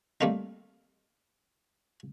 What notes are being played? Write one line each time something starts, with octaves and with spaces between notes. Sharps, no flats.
G3 A3 A#3 C4 D#4